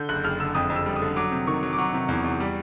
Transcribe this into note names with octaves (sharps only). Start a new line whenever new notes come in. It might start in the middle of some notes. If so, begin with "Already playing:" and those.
Already playing: D3 G6
F#1 F#6
F#1 F6
D3 E6
F2 D#6
F2
E6
G3
D#6
D3
F#3 D6
C3
D#3 C#6
F#3
D6
F#3 C#6
C3
E2
E2
G3